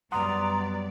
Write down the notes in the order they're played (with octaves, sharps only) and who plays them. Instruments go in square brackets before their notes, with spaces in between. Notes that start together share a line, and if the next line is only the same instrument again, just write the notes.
[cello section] F#2 D5 [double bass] G3 B3 [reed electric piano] F#5 C6 D#6 [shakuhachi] A#5